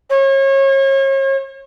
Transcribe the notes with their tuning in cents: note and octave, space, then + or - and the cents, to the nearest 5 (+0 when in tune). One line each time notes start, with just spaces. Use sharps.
C#5 -35